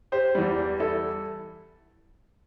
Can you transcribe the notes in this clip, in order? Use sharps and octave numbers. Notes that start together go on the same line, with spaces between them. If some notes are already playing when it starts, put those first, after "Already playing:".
G4 C5
E2 E3 G3
E4 A4